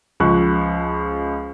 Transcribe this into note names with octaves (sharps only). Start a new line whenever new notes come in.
C#2 F3 C#6 F#6